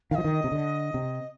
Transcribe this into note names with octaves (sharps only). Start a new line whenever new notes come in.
D#3 F5
F3 D#5
D#3
C3
D3
C3